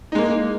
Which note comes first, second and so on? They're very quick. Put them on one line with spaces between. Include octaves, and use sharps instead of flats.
D#4 G#3 A#3